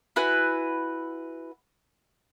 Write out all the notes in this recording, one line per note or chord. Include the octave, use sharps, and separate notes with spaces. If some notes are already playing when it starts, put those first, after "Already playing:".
E4 F#4 B4 G#5